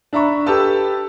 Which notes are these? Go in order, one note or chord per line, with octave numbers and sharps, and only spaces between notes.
D4 E5 A#5 B5 C#6
G4 A4 B4 A5 E6